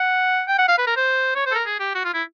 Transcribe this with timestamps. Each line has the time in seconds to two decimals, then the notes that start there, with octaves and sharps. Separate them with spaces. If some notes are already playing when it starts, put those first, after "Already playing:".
Already playing: F#5
0.48 G5
0.58 F#5
0.68 F5
0.78 B4
0.87 A#4
0.97 C5
1.35 C#5
1.46 C5
1.51 A4
1.55 A#4
1.66 G#4
1.80 G4
1.95 F#4
2.04 F4
2.14 E4